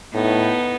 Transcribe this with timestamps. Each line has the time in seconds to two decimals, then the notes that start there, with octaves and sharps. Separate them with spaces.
0.14 A2 B3 D#4